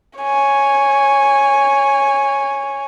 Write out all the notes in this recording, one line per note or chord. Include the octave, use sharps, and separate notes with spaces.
C#5 G#5